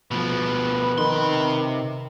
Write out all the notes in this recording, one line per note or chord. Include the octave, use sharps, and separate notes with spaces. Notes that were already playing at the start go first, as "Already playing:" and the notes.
B2 F3 B4
C3 D#3 C6